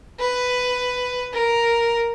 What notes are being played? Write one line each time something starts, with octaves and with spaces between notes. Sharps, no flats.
B4
A#4